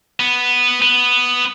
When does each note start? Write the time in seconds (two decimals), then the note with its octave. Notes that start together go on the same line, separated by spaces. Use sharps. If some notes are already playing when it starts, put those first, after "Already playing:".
0.20 B3
0.82 B3